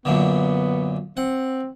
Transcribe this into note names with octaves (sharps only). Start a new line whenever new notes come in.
F#2 A#2 D3 B3
C4 F#5